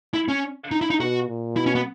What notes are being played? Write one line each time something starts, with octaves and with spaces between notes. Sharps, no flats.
E4
C#4
D#4
E4
D#4
B2 F#4
A#2
B2 E4
C#4
B3